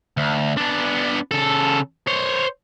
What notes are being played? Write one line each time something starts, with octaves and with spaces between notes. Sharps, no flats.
D2
B3 D4
C#3 A4
C5 C#5